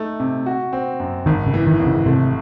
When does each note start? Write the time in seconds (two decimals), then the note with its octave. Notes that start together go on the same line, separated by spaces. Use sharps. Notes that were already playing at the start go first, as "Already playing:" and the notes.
Already playing: A3 D#4
0.20 C3
0.46 F#4
0.73 C4
1.00 F#2
1.26 G#1 D#3
1.47 C#3
1.54 E3
1.67 D#3
1.79 G#1
1.86 C#3
2.06 C3 A3